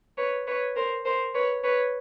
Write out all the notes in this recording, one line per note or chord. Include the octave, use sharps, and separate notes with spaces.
B4 C#5
B4 C#5
A#4 C5
A#4 C5
B4 C#5
B4 C#5